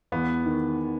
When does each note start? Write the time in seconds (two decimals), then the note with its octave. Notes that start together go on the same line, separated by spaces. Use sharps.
0.12 E2 B3
0.46 D#3